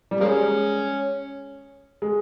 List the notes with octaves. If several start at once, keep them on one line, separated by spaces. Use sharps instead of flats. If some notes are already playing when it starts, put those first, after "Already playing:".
G3
F3 G#3 A#3 C#4
G#3